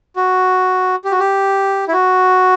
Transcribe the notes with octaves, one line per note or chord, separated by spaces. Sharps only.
F#4
G4
F#4
G4
E4
F#4